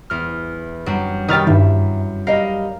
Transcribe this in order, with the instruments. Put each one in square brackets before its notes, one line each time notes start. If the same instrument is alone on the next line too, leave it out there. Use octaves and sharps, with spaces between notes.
[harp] E2 F6
F#2 G3 D4
[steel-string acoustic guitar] D#3 G3 G5 [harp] E4 [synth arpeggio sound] D#6 F6 A6
[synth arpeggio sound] G2 D#3 [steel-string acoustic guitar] E5
[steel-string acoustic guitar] G3 D#5 [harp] A#4 F5